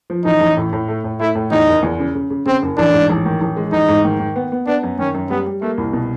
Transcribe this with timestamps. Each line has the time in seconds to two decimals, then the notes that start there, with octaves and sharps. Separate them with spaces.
0.10 F3
0.25 A1 D#4
0.41 A1
0.57 A2
0.73 A2
0.88 A3
1.04 A2
1.20 A3 E4
1.35 A2
1.52 E2 D#4
1.67 F#1
1.83 E2
1.99 C#3
2.15 C#3
2.30 C#3
2.46 C#3 C4
2.63 F#1
2.77 A1 D4
2.93 G#2
3.09 A1
3.25 D#3
3.41 A1
3.57 G#3
3.72 A1 D#4
3.89 G#2
4.04 D#3
4.19 D#3
4.36 B3
4.52 B3
4.67 B3 D4
4.83 F#2
4.99 D#3 C#4
5.14 F#2
5.30 G3 B3
5.46 G3
5.62 A3 A#3
5.78 C2
5.93 B2